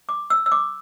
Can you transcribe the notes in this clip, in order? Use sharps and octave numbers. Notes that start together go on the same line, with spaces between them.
D6
E6
E6
D6